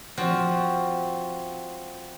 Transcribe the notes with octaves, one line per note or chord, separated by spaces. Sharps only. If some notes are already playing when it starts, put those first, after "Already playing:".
F3 C4 F#4